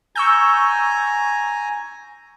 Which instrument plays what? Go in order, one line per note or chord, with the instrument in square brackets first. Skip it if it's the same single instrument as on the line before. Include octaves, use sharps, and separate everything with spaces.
[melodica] G#5 A#5 [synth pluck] C#6 E6 G6